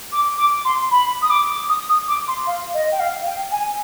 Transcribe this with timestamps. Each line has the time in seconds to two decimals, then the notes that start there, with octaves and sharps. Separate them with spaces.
0.12 D6
0.38 D6
0.65 C6
0.91 B5
1.22 D#6
1.30 D6
1.69 D#6
1.89 D#6
2.08 D6
2.28 C6
2.47 F5
2.74 D#5
2.92 G5
3.00 F5
3.26 G5
3.52 G#5